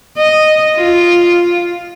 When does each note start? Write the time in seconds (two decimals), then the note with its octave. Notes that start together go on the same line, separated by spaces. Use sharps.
0.18 D#5
0.76 F4